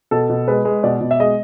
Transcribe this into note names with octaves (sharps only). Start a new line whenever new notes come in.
B2 A4
B2
G#3 B4
G#3
B2 D5
B2
E5
G#3 D#5